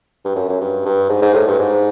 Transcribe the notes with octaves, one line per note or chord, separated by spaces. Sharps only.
G2
F#2
F#2
G2
G2
G#2
G#2
A2
G2
G#2